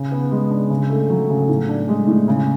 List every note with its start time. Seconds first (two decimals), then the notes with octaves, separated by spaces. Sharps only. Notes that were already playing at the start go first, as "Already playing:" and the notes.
Already playing: C#3
0.12 B3
0.31 G#3
0.51 D4
0.70 C#3
0.90 A3
1.10 F#3
1.30 C#3
1.48 A2
1.69 D4
1.89 G#3
2.07 A2
2.28 C#3